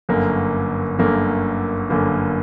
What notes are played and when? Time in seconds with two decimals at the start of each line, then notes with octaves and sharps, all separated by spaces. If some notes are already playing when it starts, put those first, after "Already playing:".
0.09 G1 F#2 D3 A#3
0.99 G1 F#2 D3 A#3
1.90 G1 F#2 D3 A#3